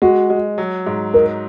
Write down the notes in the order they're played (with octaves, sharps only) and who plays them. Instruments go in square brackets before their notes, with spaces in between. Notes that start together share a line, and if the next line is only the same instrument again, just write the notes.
[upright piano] G#3 [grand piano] F#4
[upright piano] G#3
F#3
G#2
[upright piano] D#4 [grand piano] A#4